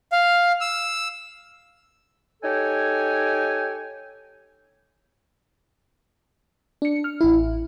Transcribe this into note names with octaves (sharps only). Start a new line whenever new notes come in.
F5
E6
D#4 G4 A4 C#5 G5 G#5
D4 C#7
F6
A1 E4